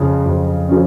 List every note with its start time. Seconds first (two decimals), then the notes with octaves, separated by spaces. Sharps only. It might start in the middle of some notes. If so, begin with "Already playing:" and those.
Already playing: F2 C#3 F3 C#4
0.26 F2
0.69 F3 C#4